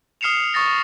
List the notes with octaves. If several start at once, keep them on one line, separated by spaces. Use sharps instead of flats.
D#6 F6 C7 C#7 E7 F7
C#6 D#6 A6 A#6 C#7